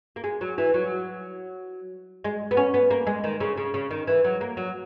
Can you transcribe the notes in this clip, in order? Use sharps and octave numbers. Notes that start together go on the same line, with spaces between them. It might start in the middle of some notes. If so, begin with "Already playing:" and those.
A#3
G#3
F#3
E3
F#3
G#3
B3
C#4
B3
A#3
G#3
D#3
C#3
C#3
C#3
D#3
E3
F#3
A#3
F#3